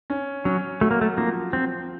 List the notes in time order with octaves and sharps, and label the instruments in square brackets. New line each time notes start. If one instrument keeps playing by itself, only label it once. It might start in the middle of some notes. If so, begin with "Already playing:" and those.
[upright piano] C#4
[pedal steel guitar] F#3 [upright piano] C#4
[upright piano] F#3 [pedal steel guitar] A3
[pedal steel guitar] A#3
A3
[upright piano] F3 [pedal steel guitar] A#3
[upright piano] F3 [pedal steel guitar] C4